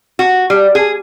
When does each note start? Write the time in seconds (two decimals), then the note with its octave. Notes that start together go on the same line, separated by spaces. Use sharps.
0.19 F#4
0.50 G3
0.75 G#4